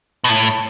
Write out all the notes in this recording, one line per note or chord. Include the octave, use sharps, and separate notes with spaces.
B2
A2